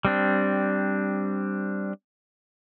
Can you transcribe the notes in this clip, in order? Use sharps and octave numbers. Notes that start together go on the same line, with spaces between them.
G3 C4 D4